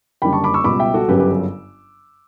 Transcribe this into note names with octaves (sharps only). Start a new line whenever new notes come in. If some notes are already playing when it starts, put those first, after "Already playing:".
F#1 F#2 D3 G3 G5 B5
A5 C#6
B5 D6
C#6 E6
C#2 B2 G3 B5 D6
E5 G5
F#4 A4
G1 F#2 C#3 F#3 G4 B4
G4 B4